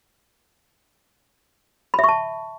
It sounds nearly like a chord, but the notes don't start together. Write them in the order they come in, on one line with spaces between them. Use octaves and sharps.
B5 E5 C#6 A5